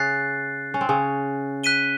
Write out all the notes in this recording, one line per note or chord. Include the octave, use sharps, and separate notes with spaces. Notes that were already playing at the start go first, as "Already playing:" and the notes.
Already playing: C#3 C#4 F#6 A6 C7
C#4
C4
C#3 C#4
F#6 B6 D#7 G7